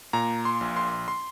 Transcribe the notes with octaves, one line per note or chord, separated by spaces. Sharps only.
A#2 A#5
C6
A#1
C6
C6